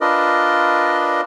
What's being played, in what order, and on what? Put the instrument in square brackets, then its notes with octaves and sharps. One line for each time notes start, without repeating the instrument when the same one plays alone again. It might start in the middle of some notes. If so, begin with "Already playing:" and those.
[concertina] D4 F4 A#4 B4 D5 D#5